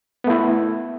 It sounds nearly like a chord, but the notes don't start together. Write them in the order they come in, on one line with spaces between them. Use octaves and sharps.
B3 A3 E4